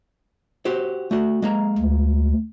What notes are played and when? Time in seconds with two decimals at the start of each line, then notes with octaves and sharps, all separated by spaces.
0.65 F#4 G4 C5
1.11 A3 F#4
1.42 G#3 A#3 A#5
1.78 D2